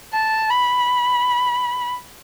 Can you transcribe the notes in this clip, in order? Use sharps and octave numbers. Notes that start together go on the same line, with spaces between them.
A5
B5